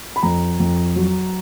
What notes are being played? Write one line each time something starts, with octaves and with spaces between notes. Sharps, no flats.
B5
F2 A#5
F2
F#3